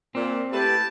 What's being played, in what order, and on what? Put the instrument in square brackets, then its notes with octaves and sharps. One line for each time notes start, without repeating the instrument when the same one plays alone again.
[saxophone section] A#2 [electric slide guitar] C4
[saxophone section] A3 E4 B4 [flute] G4 [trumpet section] A5